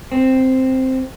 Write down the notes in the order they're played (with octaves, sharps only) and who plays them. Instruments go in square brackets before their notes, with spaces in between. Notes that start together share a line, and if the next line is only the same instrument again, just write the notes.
[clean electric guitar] C4